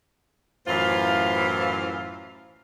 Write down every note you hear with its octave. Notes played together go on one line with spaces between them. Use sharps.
F#2 A2 E3 F4 C5 F5